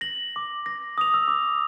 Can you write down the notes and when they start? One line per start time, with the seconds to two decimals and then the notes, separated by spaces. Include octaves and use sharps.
0.01 A#6 F#7
0.36 D6
0.66 A#6
0.98 D#6 F7
1.14 E6
1.28 D6